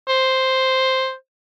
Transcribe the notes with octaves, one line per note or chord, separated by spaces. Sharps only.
C5